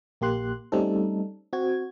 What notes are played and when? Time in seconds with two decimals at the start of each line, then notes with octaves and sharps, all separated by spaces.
0.21 A#1 A#3 G4 C6 F#6
0.72 G3 A3 C4 C#4 D#4 A4
1.53 C4 F#4 G#6